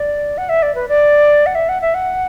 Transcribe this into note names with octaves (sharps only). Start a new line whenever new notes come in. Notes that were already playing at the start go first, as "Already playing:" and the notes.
Already playing: D5
F#5
E5
D5
B4
D5
F#5
E5
F#5
E5
F#5